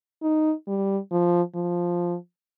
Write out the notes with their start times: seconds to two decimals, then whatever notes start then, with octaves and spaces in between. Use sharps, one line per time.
0.22 D#4
0.67 G3
1.11 F3
1.55 F3